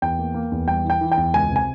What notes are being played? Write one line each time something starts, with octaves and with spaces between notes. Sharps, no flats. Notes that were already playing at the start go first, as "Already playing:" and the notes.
E2 G5
A#3
A#3
E2
G3 G5
E3
G5
E3
G5
E2
C#2 G#5
C3
G#5